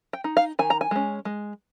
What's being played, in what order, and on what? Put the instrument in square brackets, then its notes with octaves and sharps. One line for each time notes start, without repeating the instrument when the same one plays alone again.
[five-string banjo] G5
D#4
F5
D#3 G#5
A#5
G#5
G#3 C#4
G#3